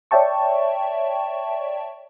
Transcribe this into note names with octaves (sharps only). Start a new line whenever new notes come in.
C#5 D5 E5 G5 A5 C#6